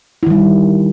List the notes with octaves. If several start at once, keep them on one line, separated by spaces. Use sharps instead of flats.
D#3 G3 E4